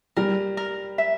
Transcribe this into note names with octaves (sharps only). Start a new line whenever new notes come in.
G3 A#4
A#4
E5